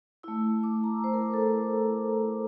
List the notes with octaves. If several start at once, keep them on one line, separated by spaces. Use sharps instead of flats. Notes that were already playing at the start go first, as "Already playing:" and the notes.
A3 E4 E6
D6
A#5
C5
A#4
A4